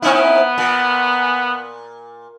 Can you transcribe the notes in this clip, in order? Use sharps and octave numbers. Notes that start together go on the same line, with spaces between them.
B3 C4 D#4 E4
A#2